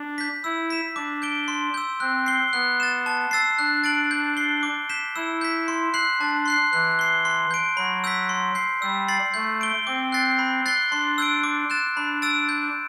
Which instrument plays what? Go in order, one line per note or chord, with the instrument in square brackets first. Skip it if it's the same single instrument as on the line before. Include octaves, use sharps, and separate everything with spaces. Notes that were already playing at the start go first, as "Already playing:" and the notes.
Already playing: [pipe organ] D4
[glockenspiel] G6 B6
[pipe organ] E4 [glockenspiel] E6
[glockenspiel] B6 E7
[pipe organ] D4 [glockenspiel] D6
[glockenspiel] G6 D7 G7
C6
E6 G6
[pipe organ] C4 [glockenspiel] F#6
[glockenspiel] C7 G7
[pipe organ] B3 [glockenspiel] F#6
[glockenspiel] A6 E7
A5
E6 A6 C7
[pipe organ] D4 [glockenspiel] F#6
[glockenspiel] A6 D7 F#7
G6
C7 G7
D6
G6 B6 E7
[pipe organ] E4 [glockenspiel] E6
[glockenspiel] G6 B6
C6
F#6 C7 F#7
[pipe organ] D4 [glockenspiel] A5
[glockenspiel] C6 F#6 C7
[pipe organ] E3 [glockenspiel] F#6
[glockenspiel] C7 G7
C6
G6 D7
[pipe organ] F#3 [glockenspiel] B5
[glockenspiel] E6 G6 B6
C6
G6 C7
[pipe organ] G3 [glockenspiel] E6
[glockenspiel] A6 C7 F#7
[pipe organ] A3 [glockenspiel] G6
[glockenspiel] D7 G7
[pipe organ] C4 [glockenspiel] D6
[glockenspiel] F#6 A6 C7
B5
F#6 A6 C7 G7
[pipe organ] D4 [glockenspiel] C6
[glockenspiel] E6 G6 D7
D6
F#6 A6 E7
[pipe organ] D4 [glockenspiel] B5
[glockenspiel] E6 A6 D7
G6